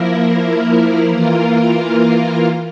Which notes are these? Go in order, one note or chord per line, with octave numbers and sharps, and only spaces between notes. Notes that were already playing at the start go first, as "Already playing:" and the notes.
Already playing: F3 A#3 E4 A#4
E3 A#3 F4 A#4